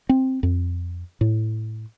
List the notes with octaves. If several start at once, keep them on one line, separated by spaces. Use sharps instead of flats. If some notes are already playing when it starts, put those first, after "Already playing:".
C4
F2
A2